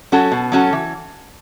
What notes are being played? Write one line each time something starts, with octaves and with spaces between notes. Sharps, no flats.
F#3 C#4 F#4 A4
B2
F#3 C#4 F#4 A4
E3